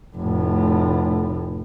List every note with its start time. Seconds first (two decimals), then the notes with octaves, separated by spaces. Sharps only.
0.16 F1 A2